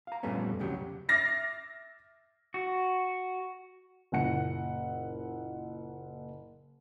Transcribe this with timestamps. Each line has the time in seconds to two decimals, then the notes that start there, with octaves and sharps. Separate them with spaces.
0.07 F5 A#5
0.23 F2 A#2 G3 A3 B3 C#4
0.59 C2 F2 C#3 F#3 G4
1.09 E5 D6 F6 A6 A#6 C7
2.54 F#4
4.12 F#1 A#2 F#5 C#7